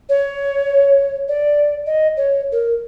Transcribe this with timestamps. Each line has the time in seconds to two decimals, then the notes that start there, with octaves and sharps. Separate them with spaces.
0.09 C#5
1.28 D5
1.86 D#5
2.17 C#5
2.52 A#4